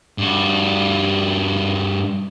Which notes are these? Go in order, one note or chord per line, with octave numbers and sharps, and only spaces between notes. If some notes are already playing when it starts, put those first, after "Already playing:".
G2 F#4